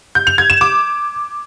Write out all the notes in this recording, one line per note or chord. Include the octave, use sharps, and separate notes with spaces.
G6
F7
G#6
E7
D6